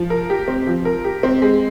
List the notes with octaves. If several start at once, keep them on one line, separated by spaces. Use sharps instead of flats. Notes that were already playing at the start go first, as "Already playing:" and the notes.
Already playing: F3
A#4
G4
C4
F3
A#4
G4
C4
G#3